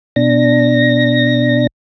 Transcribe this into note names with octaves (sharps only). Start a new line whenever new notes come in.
B2 D4 A#6